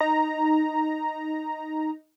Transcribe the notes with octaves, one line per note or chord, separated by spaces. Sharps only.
D#4 A#5